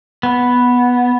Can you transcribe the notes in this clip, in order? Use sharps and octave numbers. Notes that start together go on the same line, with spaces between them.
B3